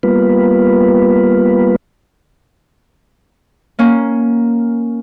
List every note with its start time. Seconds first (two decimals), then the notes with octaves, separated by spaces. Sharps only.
0.03 G3 A#3 B3 F4 B4
3.79 A#3 C#4